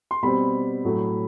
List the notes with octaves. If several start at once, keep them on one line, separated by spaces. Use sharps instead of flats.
C6
B2 G3 C4 B5
A2 F#3 A3